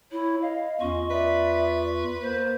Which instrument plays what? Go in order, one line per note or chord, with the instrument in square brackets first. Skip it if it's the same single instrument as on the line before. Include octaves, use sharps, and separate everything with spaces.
[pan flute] E4 [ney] C#5
[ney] D#5 [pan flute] F5
[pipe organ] E2 F4 C#6 [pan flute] C#4
[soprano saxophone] B4 [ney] D5 [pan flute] E5
[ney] A#3 [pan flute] C5